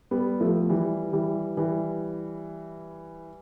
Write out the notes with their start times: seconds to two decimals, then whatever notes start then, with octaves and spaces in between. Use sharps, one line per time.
0.11 G3 B3
0.40 F3 A3
0.70 E3 G3
1.13 E3 G3
1.57 E3 G3